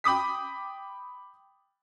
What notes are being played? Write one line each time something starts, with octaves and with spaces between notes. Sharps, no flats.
G5 B5 D6 D#6 B6